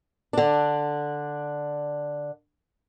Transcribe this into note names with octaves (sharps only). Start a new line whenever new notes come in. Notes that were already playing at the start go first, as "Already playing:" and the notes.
D3 D4